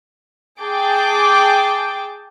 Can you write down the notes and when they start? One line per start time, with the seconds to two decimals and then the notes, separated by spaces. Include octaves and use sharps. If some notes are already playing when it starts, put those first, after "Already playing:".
0.60 G#4 G5 A5 D6